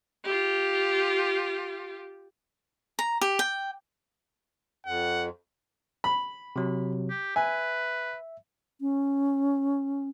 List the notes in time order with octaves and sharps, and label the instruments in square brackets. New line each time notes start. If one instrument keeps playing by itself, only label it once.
[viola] F4 G4
[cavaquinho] A#5
G4
G5
[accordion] F2 [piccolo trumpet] F#5
[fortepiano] B5
[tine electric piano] C3 F#3
[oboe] G4
[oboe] B4 [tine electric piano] E5 [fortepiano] G#5
[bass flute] C#4